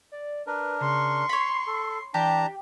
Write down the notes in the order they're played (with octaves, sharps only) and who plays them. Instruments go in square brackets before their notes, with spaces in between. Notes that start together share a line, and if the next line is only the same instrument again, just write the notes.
[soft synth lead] D5
[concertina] D4 A#4 [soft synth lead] B4
[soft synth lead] C#3 [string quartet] C6 C#6
[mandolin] C#5 B5 [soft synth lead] C7
[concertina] A4
[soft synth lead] E3 [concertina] D4 A5 A#5 [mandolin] G4